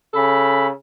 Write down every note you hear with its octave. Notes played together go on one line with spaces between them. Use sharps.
C#3 A4 B5